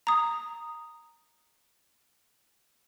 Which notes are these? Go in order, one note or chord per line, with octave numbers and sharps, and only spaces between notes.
A#5 D#6